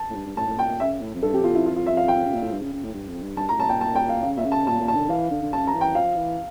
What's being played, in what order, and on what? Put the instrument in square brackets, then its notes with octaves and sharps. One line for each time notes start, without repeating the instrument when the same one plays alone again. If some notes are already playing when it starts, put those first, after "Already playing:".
Already playing: [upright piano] A5
[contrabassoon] A2
G2
G2
[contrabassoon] A2 [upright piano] A5
[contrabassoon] A2
[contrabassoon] A#2 [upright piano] G5
[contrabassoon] A#2
[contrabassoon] C#3 [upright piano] E5
[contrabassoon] A2
F2
[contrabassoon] G2 [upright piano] A4
[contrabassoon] F2 [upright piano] G4
[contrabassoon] E2 [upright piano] F4
[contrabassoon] F2 [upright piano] E4
[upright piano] F4
F4
E5
F5
G5
[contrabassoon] C#3
A#2
A2
G2
C#3
C#3
A2
G2
F2
G2
[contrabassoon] G2 [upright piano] A5
[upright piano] A#5
[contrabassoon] A2
[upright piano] A5
[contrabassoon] A#2 [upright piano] G5
[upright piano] A5
G5
F5
[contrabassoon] C#3 [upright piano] F5
[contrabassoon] A#2 [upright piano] E5
[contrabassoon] C#3
[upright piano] A5
[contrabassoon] A#2 [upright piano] A5
[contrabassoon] A#2
[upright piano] A5
[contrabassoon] D3
[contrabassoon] E3 [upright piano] F5
[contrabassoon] D3
D3
[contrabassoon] C#3 [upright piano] A5
[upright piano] A#5
[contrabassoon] E3
[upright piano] G5
[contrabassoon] F3 [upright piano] F5
[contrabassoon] E3